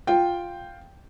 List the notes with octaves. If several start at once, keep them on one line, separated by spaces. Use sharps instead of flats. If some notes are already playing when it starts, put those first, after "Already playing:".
F4 G5